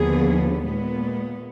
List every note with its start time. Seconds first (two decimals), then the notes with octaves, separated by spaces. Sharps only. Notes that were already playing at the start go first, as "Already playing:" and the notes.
Already playing: D#2 D3 F3 B3 G#4
0.64 A#2 G#3 B3